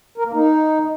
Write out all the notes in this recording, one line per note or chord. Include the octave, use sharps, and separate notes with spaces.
A#4
A#3
D#4